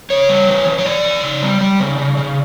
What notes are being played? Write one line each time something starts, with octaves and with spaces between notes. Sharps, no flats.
C#3 C#5
G3
E3
E3
C#5
E3 D5
E3
C#3
G3
G3
C#3
C#3
C#3